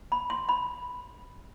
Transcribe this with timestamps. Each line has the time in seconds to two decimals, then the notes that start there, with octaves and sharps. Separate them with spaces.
0.12 B5
0.30 C6
0.49 B5